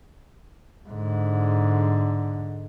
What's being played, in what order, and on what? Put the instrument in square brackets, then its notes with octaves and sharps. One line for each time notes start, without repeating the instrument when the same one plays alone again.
[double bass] G#2 D3